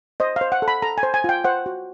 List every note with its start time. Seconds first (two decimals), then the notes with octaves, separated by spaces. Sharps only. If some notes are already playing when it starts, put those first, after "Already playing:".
0.20 C5 D#5
0.36 F5
0.41 C5
0.52 F#5
0.62 A4
0.68 B5
0.82 A4 A#5
0.98 G#5
1.03 C5
1.14 G#5
1.24 F4 G5
1.44 C5 F#5
1.66 F#4